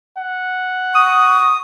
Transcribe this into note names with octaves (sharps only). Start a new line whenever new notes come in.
F#5
C#6 D#6